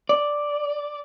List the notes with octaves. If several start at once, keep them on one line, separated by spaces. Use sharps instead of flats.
D5